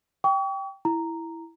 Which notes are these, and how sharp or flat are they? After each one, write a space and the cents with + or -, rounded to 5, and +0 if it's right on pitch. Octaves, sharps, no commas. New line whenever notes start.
G5 +0 C#6 +40
E4 +0 A#5 -5